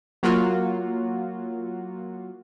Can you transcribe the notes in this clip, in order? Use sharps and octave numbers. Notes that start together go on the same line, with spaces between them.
F#3 A#3 F4 F#4